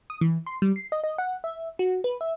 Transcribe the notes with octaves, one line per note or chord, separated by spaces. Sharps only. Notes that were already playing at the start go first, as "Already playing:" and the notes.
D#6
E3
C6
G3
C7
D#5
D#5
F#5
E5
F#4
B4
E5